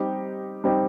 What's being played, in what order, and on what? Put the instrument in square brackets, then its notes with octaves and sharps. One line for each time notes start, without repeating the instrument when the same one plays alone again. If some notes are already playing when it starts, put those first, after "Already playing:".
Already playing: [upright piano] G3 C4 D#4 G4
G3 C4 D#4 G4